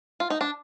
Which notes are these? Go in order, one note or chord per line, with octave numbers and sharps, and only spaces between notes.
F4
D#4
D4